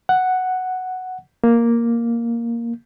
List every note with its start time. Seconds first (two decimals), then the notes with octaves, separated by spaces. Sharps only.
0.09 F#5
1.44 A#3